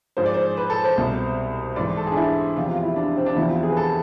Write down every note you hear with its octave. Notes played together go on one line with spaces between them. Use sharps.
G#2 F3 C5
D5
C5
B4
A4
C5
C2 B2
G#2 E3 D5
A4
G#4
D4
E4
E2 C3 F3 F4
F4
E4
D4
C4
D4
E2 C3 F3 E4
F4
G#4
B4
A4